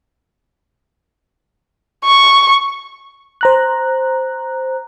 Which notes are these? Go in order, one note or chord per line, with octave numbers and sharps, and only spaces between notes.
C#6
C5 A#5 F#6